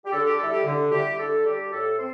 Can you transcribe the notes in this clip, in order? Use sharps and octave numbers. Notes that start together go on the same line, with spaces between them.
G4
D3 A4
G4
G3 E4 A4
G4
D3
G3 E4 G4
D3 A4
G3 D4 G4
A2 A4
C4 C5